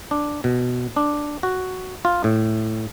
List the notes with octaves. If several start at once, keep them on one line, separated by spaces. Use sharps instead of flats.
D4
B2
D4
F#4
F4
A2